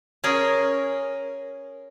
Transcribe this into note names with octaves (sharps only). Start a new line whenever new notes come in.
C#4 G#4 A#4